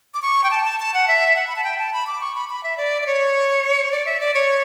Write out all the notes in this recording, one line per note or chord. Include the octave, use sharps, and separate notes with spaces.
D6
C#6
G5
A5
A5
A5
F#5
E5
F#5
B5
A5
G5
A5
B5
D6
C#6
B5
B5
E5
D5
D5
C#5
D5
E5
D5
C#5